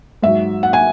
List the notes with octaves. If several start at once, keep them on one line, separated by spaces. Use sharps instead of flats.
G#2 F#3 E5
F#5
G#5